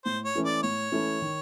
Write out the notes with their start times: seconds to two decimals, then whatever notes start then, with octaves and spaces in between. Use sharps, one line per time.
0.05 A2 C5
0.25 C#5
0.35 E3 A3 C#4 E4
0.45 D5
0.63 A2 C#5
0.92 E3 A3 C#4 E4
1.21 D#3